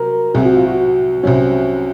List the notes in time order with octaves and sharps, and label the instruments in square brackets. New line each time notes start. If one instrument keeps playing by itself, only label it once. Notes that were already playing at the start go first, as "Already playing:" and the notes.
Already playing: [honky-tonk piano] C3 F#3 [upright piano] A#4
[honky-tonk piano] C2 C3 F#3 [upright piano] G#4
[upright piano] F#4
F4
F#4
[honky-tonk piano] C2 C3 F#3 [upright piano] C#4